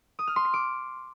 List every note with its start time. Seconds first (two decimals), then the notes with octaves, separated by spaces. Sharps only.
0.19 D#6
0.27 F6
0.36 C6
0.45 C7
0.54 D6